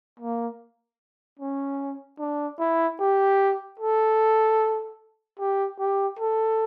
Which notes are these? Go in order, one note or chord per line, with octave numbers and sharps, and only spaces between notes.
A#3
C#4
D4
E4
G4
A4
G4
G4
A4